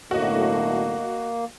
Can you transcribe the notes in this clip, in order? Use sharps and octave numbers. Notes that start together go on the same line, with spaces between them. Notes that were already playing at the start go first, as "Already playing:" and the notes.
B1 A2 D3 A#3 F#4 D#5